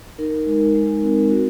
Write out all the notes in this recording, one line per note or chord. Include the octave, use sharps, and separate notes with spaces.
D#4 A#4
G#3
G#3
C4
F#4 A#4